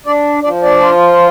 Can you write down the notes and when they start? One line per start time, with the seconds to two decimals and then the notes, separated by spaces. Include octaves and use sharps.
0.06 D4 D5
0.43 F3 D4 D5
0.62 D4 D5
0.81 F4